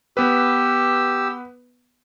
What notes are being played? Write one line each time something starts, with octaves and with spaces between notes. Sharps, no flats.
B3 G4 B4 E6